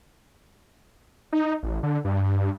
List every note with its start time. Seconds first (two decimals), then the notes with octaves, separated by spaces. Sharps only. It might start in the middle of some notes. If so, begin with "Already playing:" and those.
1.33 D#4
1.63 A1
1.83 D3
2.05 G2